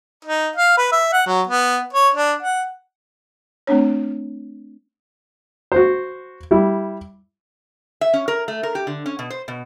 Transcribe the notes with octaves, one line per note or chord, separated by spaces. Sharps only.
D#4
F5
B4
E5
F#5
F#3
B3
C#5
D4
F#5
A3 C4 D4 C#5
F#4 C5
G3 E4
E5
C#4
A#4
A3
A#4
G4
D3
C#4
B2
C5
B2